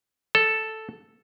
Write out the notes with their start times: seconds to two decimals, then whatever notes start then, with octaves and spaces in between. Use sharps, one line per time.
0.35 A4